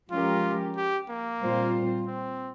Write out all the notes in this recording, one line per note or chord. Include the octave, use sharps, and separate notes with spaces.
F3 G#3 C#4 F4 G4 A#4
G4
A#3
A#2 G3 C4 F4 C5
C4